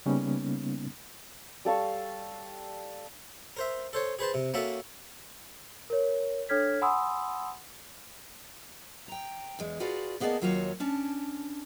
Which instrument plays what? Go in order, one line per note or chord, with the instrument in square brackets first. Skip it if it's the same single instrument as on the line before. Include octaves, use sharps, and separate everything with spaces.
[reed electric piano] C#3 G3 A#3 B3 C#4 D#4
[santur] G3 A4 F5 C#6
[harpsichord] A#4 C5 E5
A4 C5 C#5
G#4 B4 C5 A5
C3
A#3 C#4 F#4 A4 E5
[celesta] A#4 C#5
D4 A4 C#5 F6 G#6 B6
F#5 G#5 B5 C6 D#6 E6
[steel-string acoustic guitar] G5 A#5
E2 G#3
F4 F#4 G#4 B4 D5 F5
A#3 B3 G#4 D5 D#5 A5
D#2 F#3 F4 F#4 C#5 F5
C#4 D4 A5